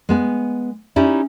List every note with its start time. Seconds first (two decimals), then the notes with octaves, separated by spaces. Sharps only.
0.09 G#3 B3 G#5
0.96 C#4 D#4 E4 G4 D5